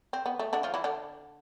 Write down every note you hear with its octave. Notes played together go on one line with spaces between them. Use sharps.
C4
B3
A3
D3 D4
F3 F4
E3 E4
D3 D4